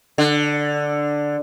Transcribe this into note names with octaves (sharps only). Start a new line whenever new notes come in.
D3